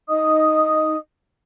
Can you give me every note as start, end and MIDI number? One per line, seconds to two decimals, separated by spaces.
0.09 0.96 63
0.09 0.96 75
0.09 0.96 87